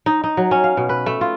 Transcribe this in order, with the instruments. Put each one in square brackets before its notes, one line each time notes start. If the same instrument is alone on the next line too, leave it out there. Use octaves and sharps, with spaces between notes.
[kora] D#4
D#4
F#3
C#4
F5
B2
B4
A3
F4